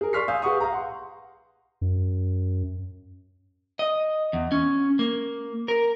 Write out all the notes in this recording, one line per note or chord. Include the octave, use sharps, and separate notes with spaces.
G#4 A#4
D5 C6 C#6 F6 B6 C7
F5 G#5 D#6 E6 G6
G#4 B4 F#5 C#6 D#6
F5 A#5
F#5 C6
F#2
D#5
E2
C#4
A#3
A#4